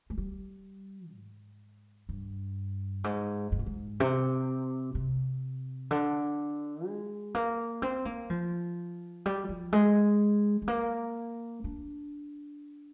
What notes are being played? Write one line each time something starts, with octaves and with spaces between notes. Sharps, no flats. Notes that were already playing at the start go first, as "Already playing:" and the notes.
G#3
G3
G#2
G2
G#2
G#2
A#2
G#2
C3
C3
D3
G#3
A#3
C4
A#3
F3
G3
F3
G#3
G#3
A#3
D4